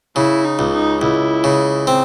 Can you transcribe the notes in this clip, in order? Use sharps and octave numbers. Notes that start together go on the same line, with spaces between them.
C#3 E4
D#4
C#2
D#4
C#2 E4
C#3
C4